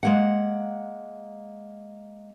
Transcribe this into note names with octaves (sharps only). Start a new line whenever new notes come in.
G#3 A#3 F#5